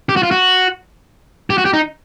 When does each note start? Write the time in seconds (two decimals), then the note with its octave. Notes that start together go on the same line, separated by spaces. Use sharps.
0.09 G4
0.16 F#4
0.23 F4
0.31 F#4
1.50 G4
1.58 F#4
1.65 G4
1.73 D#4